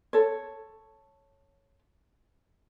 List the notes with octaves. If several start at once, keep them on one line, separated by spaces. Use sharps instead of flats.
A4 C#5